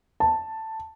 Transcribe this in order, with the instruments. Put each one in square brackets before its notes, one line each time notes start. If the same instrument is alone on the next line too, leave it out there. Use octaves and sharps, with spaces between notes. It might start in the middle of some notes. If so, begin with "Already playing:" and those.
[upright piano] A5